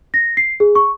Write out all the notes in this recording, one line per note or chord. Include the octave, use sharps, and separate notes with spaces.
A#6
C7
G#4
C#6